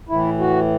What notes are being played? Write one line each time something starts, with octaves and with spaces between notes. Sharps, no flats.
A2 E3 E4
F#4